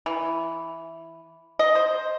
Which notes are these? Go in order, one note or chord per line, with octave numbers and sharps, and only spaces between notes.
E3
D#5
C5